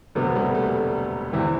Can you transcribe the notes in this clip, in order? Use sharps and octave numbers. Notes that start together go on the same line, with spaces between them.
E1 D2 C3 F#3 B3
G3
A3
E2 C3 E3 E4